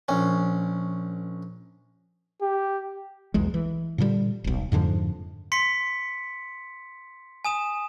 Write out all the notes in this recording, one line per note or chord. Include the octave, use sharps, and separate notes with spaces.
A#1 C#4
G4
B1 E2 G#3
E3
A#2 D3 F#3 G3
D#1 B1
F2 G#2 D3 F3
C6 B6 C#7
G#5 D#6 E7